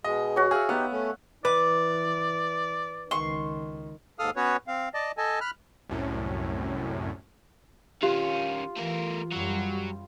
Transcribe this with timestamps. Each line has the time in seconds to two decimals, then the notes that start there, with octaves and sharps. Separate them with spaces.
0.04 B2 G#3 D#5
0.36 F#4 C#5
0.51 G#4 E5 F5
0.69 B3 D#4 G4 F#5
0.92 A3 C#4
1.45 E3 B4 D5 D6
3.11 C#2 D#3 C6 C#6
4.19 D#2 G#2 A4 F5 D#6 F6
4.36 B3 C#4 F#4 B4 C#5
4.68 C4 F5
4.94 D5 D#5 A5
5.17 A4 D#5 G#5 A5
5.41 B5 F6 F#6
5.89 C2 F#2 A2
8.03 D#3 C#4 F4 G4
8.76 E3 A3 A#4
9.32 F#2 F#3 G3 F#4